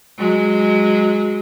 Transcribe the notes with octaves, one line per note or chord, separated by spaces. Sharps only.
F#3 G#3